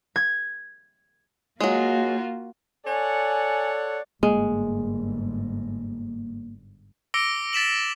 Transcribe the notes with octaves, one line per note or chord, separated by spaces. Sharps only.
G#6
F#3 G#3 A#3 F4 F#4
A4 C#5 D5 F#5 G#5
G1 G#2 G#3 A#3
D6 E6 A#6 C#7 D7 G7
A6 B6 E7 F#7